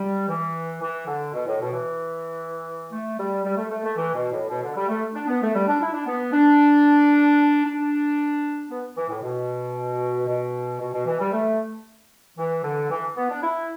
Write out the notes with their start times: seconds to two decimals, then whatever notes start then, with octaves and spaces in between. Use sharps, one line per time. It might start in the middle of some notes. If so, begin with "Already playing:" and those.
Already playing: G3
0.29 E3
0.81 E3
1.07 D3
1.33 B2
1.47 A2
1.60 B2
1.73 E3
2.91 A3
3.18 G3
3.44 G3
3.57 A3
3.70 A3
3.84 A3
3.97 E3
4.15 B2
4.31 A2
4.49 B2
4.62 D3
4.76 G3
4.89 A3
5.14 D4
5.27 B3
5.41 A3
5.55 G3
5.67 D4
5.81 E4
5.93 D4
6.06 B3
6.32 D4
7.65 D4
8.69 B3
8.96 E3
9.09 A2
9.22 B2
10.27 B2
10.80 B2
10.93 B2
11.06 E3
11.19 G3
11.32 A3
12.38 E3
12.64 D3
12.90 E3
13.16 B3
13.29 D4
13.42 E4